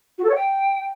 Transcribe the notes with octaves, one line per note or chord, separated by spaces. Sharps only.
F#4
A4
C#5
G5